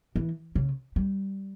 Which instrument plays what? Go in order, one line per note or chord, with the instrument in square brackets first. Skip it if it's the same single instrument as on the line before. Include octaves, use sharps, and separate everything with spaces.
[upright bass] E3
C#3
G3